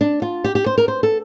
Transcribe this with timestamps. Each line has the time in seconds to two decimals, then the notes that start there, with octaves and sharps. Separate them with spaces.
0.01 D4
0.22 F4
0.44 G4
0.55 G4
0.66 C5
0.78 A#4
0.88 C5
1.03 A4